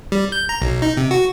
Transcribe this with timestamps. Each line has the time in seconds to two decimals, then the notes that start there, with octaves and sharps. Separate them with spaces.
0.12 G3
0.32 G6
0.49 A#5
0.62 B1
0.82 D#4
0.97 C3
1.11 F#4